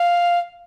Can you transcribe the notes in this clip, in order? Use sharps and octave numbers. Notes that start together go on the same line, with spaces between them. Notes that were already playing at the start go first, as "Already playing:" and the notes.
Already playing: F5